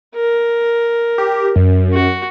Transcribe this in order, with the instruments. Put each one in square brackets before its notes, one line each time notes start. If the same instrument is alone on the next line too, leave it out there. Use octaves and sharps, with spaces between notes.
[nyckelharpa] A#4
[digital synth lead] G4
F#2
[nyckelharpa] F#4